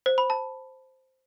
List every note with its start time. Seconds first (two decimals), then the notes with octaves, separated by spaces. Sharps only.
0.06 C5
0.18 B5
0.30 A5